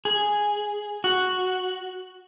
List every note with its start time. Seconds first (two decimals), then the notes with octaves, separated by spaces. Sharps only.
0.05 G#4
1.04 F#4